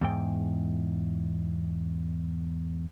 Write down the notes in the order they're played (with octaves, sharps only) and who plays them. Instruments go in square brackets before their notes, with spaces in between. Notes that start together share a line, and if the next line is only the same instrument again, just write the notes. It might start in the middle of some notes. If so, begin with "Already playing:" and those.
[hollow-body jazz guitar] E2 G#2 G5